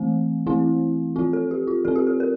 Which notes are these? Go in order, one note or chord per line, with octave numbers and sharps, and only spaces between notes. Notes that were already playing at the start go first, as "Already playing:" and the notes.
Already playing: E3 A3 C4
E3 A3 C4 E4
F3 C4 F4
A4
G4
F4
F3 C4 A4
G4
A4
A#4